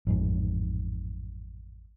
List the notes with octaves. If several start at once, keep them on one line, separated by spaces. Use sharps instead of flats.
A1 F2 G#2